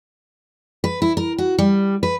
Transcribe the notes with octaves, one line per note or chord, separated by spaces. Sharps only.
B4
E4
A#4
F#4
G3
B4